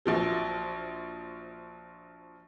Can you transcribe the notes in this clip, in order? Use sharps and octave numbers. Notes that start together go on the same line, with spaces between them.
A#1 F3 F#3